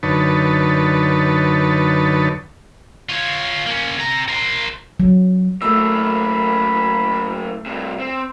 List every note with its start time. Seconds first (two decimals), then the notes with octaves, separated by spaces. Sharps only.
0.03 F#2 D3 D#4 B4 C#5 A5
3.09 F4 C#5
3.66 A#3 C#4
3.98 C3 A#5
4.28 A#4 C5
5.00 F#3
5.62 F#2 A3 A#3 B5 E6
7.66 G2 C3
8.00 C4